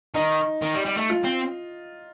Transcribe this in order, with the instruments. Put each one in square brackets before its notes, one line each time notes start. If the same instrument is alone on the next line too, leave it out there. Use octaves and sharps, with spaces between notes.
[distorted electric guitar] D#3 [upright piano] D#4
[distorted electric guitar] D#3
G3
G3
A3
[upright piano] F4
[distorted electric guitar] C4